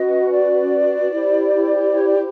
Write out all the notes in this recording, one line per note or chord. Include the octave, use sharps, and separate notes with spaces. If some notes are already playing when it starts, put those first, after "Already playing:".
Already playing: C#4 F#4 B4 D#5
D5
E4 G4 C5
C#5
D5